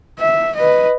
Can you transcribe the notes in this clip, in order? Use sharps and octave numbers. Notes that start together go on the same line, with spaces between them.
E5
B4 D#5